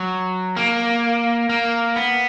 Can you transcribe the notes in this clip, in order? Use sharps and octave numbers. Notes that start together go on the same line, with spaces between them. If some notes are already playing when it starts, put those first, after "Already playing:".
Already playing: F#3
A#3
A#3
B3